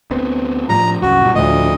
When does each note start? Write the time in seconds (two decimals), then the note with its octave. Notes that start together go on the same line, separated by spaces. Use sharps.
0.11 D2 B3 C4
0.69 A2 F3 G3 A#5
1.02 C2 F#2 F#4
1.22 A#2 G3
1.35 D2 A2 F3 D#5